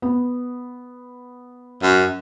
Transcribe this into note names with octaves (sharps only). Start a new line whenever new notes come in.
B3
F#2